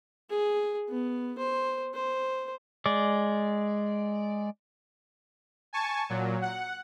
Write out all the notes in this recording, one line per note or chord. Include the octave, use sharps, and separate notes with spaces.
G#4
B3
C5
C5
G#3 D5
G#5 A5 C#6
A#2 F#3
F#5